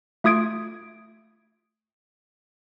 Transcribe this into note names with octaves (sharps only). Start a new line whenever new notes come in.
A3 F4 D#6 G#6 D7